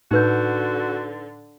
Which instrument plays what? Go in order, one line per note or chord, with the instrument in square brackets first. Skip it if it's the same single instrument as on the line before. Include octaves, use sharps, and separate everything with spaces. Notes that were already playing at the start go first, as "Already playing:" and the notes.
[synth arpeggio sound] A2 [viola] D3 [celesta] D#4 B4 G6 [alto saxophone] F#4